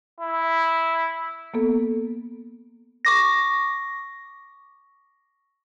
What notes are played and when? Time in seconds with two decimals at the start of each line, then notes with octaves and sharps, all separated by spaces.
0.21 E4
1.54 A#3 B3 A4
3.05 C#6 D6 A#6